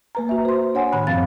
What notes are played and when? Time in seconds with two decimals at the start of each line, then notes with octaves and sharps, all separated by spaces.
0.15 A#3 B4 A#5
0.29 F#4 E5
0.45 C5 C6
0.74 D4 C#5 F#5 G#5
0.92 A2 D#3 B5 F#6
1.07 F#2 F3 C4 F5 A6